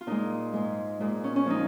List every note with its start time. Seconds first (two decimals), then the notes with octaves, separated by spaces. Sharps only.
0.01 F4
0.07 A#2 G#3 D#4
0.53 G#2 G#3
1.00 A#2 G#3
1.24 C#4
1.36 C#4
1.46 F3 G#3 D#4